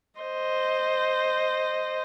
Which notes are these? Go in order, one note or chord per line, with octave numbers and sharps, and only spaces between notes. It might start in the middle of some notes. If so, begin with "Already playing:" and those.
C5 D#5